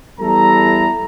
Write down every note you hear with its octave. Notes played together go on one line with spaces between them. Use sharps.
E2 G3 E4 A4 A#5